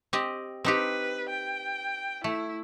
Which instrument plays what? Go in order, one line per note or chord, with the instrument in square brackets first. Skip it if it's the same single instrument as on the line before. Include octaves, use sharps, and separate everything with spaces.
[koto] C4 G4 D#5
[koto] C4 D#4 G4 [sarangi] B4
[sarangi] G5
[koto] A3 [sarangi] E4